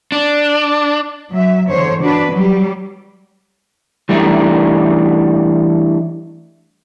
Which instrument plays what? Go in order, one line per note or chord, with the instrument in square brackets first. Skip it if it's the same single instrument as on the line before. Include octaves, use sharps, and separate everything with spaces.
[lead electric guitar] D4
[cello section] F#3 E5
E2 D3 C5 C#5
D4 F#4 B4
F#3 G3
[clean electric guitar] E3 G3 A3 D4 D#4